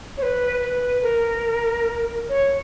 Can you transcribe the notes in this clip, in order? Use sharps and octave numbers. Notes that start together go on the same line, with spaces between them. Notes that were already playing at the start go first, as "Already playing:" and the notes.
C#5
B4
B4
A#4
C#5